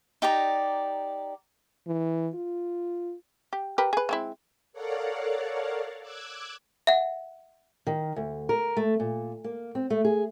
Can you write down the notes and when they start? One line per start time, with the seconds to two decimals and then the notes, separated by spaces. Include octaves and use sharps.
0.22 D#4 G4 D5 A#5
1.87 E3
2.34 F4
3.53 G4
3.78 G4 A#4 B4
3.93 G#4 B4
4.09 G#3 C4 E4
4.73 A4 A#4 C#5 D5 F5 F#5
6.01 D6 E6 F#6 G#6
6.87 E5 F#5
7.87 D#3
8.16 D2
8.49 A#4
8.77 A3
9.00 A#2
9.44 A#3
9.75 C4
9.90 A3
10.05 G#4